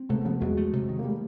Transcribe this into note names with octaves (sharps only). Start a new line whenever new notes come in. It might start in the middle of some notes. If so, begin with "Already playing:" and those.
Already playing: C4
C3 A3 B3
F3 A3 B3
E2 F#3 G#3
A3
C3
D#3
A#3
G3 A3